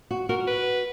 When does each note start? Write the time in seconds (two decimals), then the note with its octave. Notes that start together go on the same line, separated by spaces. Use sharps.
0.11 F#4
0.29 F#4 A#4
0.47 B4